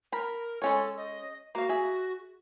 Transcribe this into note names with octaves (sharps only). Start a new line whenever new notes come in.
A#4 A#5 B5
G#3 C#4 A4 C#5
D#5
A#3 F#4 F5
G#4 E5